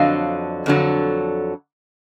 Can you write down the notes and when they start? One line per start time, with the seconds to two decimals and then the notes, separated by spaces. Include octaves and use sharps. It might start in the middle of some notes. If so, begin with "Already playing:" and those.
Already playing: F2 D3 F#3 D#5 F5
0.66 F2 D3 F#3